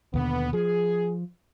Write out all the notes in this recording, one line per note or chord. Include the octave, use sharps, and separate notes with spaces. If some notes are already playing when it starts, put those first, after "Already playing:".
D#2 B2 D3 B3
F3 G#4